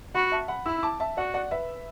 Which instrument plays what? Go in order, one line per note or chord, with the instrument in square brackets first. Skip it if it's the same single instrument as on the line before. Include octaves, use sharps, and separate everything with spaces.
[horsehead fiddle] F#4 [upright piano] F#5 B5
[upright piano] E5 A5
F#5 B5
[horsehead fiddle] E4 [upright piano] B5 E6
[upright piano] A5 D6
E5 A5
[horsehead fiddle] F#4 [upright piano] D5 F#5
[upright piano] D5 F#5
B4 E5